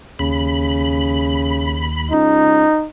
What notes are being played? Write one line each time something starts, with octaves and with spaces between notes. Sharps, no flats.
D#2 C#3 B5
C#2 D#4